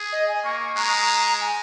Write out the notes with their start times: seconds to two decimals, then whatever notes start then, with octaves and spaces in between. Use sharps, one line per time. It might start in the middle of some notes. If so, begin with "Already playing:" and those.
Already playing: G#4
0.12 D#5
0.28 G#5
0.44 A#3 C#6
0.60 C#6
0.77 G#3 A#5
1.41 G#5